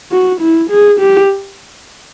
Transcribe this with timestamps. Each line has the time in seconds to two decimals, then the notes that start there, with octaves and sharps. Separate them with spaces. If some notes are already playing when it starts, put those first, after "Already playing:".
0.12 F#4
0.41 E4
0.70 G#4
1.00 G4